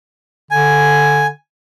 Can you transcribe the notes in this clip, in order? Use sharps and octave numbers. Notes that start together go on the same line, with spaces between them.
D3 G#5